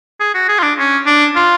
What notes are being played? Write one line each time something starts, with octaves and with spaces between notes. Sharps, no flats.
G#4
F#4
G#4
F4
D4
C#4
D4
F4